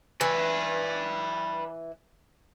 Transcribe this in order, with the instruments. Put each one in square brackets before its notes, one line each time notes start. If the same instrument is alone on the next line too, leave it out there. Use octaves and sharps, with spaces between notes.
[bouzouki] E3 [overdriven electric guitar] B4 D5